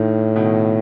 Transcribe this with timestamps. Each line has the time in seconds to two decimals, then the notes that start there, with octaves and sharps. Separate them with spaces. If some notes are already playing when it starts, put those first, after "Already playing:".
Already playing: A2 D#3
0.36 B2 D#3